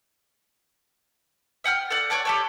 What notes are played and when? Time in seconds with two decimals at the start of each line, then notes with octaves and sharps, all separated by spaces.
1.64 E5 F#5 G5 F6
1.90 A4 D5 F#5
2.10 C#5 D5 F#5 A5
2.25 G4 A4 C#5